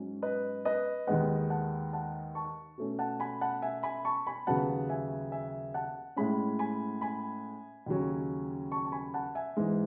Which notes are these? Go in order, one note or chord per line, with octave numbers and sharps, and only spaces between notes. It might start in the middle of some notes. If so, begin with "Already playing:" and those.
Already playing: G#2 F#3 C#4
B4 D#5
B4 D#5
D#2 D#3 G#3 B3 D#5 F#5
F#5 A5
F#5 A5
A5 C#6
B2 A3 C#4
F#5 A5
G#5 B5
F#5 A5
E5 G#5
G#5 B5
A5 C#6
G#5 B5
D#2 C#3 F#3 B3 F#5 A5
E5 G#5
E5 G#5
F#5 A5
A2 G#3 C#4 G#5 B5
G#5 B5
G#5 B5
D#2 C#3 F#3 C#4
A5 C#6
A5
G#5 B5
F#5 A5
E5 G#5
G#2 E3 G#3